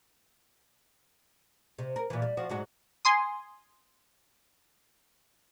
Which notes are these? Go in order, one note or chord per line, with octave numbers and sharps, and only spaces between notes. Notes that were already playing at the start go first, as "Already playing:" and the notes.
C3
A#4
A#2 E3
G3
F3 F#4
G#2 F#3 F#4
G#5 C6 D#6